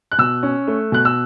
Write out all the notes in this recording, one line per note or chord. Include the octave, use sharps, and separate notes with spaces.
F#6
B2 E6
C#4
A3
B2 F#6
E6